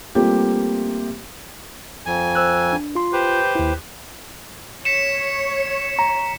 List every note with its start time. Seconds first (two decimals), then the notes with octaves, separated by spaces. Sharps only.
0.15 G3 A3 A#3 C4 F4 G4
2.06 F2 G#5
2.35 C5 E6 F#6
2.72 D4
2.95 F4 C6
3.13 G4 B4 C5
3.55 D#2 E4
4.85 C#5 B6 C#7 E7
5.99 A#5